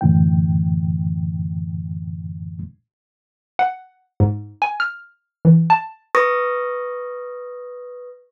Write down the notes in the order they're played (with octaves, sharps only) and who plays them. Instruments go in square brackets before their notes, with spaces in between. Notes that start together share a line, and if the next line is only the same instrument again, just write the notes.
[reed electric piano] C2 F#2 A2 D3 E3 G5
[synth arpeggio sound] F#5
G#2
G#5
F6
E3
A5
[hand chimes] B4 C#6 D#6 A#6